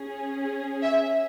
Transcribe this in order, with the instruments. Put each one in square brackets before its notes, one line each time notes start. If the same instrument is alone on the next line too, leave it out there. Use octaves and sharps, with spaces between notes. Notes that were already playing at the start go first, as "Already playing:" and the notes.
Already playing: [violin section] C#4 G#4
E5